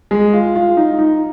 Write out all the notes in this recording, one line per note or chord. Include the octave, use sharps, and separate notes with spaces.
G#3
F4
F4
D#4
D#4